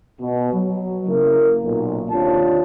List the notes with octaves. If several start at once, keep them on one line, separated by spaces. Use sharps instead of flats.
B2
F#3
C#3 A#3 E4 A#4
B1 A#2
D#2 C3 D4 F4 C#5 A5